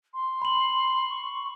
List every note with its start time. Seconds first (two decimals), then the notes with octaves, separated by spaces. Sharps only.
0.14 C6
0.42 B5 F#7
1.10 C#6